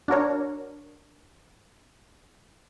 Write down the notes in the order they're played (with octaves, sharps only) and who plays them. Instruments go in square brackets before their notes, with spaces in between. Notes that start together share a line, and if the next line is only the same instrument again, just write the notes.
[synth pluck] D4 F#4 A#4 C#5